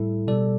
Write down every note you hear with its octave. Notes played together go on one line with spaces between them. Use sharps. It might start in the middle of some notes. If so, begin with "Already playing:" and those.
Already playing: A2 G3 E4 A4
B2 G3 A4 D5